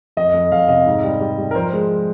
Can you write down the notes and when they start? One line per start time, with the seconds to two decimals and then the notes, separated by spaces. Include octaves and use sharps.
0.17 F2 D#5
0.34 F2
0.51 F2 F5
0.68 C3 D#5
0.86 G#2
1.04 G3
1.21 G3
1.38 G3
1.51 A#4
1.55 F3 C5
1.73 G#3